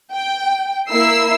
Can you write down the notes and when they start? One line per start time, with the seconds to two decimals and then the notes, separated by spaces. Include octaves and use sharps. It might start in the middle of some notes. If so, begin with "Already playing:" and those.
0.13 G5
0.88 A#3 E4 E6 C7